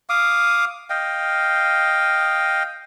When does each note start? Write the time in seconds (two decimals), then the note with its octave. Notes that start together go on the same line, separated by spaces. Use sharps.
0.09 F5 D6 D#6
0.90 D#5 F5 G5